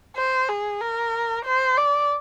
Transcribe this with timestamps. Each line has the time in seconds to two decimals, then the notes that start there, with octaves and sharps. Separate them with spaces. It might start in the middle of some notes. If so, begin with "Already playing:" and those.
0.16 C5
0.49 G#4
0.81 A#4
1.45 C5
1.77 D5